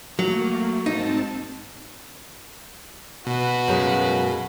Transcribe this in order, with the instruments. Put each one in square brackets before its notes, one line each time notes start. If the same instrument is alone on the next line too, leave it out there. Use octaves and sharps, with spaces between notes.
[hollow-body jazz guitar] F#3 [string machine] A3 A#3
[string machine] G#2 C4 A5 [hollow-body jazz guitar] D#4
[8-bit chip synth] B2 [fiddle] F#4 B4
[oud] F#2 C#3 G#3